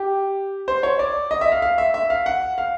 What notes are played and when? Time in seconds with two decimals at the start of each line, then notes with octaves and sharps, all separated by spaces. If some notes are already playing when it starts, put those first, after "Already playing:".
Already playing: G4
0.68 C5
0.83 C#5
0.99 D5
1.31 D#5
1.41 E5
1.52 F5
1.62 F5
1.78 E5
1.94 E5
2.10 F5
2.26 F#5
2.58 F5